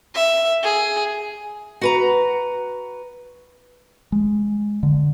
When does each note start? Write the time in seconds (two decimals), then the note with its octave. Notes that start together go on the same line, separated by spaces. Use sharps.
0.15 E5
0.63 G#4
1.81 F#4 B4 A#5
4.12 G#3
4.83 D3